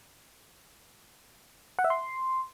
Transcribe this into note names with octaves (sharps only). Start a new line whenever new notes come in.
F#5
E5
C6